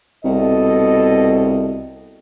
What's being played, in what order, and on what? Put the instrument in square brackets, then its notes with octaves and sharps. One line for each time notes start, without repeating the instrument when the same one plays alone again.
[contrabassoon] C2 [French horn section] B2 A4 D#5